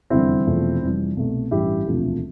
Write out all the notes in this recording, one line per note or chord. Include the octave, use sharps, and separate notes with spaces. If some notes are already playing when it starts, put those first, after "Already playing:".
F1 E2 D3 G3 C4 E4
E1 E2 C3 F3 A3
F1 F2 E3 G3
C2 B2 A3
A1 G2 E3 E4 G4
E1 D2 C3 F3 A3